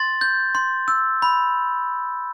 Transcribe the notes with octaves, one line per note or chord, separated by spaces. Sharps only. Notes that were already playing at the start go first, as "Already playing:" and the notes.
Already playing: C6 A6
G6
C6
E6
B5